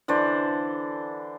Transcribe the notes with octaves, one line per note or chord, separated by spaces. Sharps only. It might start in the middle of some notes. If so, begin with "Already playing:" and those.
D3 E3 C5 D5